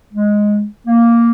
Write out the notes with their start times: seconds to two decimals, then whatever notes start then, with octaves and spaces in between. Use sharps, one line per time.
0.13 G#3
0.87 A#3